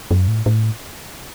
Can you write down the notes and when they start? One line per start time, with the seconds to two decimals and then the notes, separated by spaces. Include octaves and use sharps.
0.11 F#2
0.28 A2
0.46 A2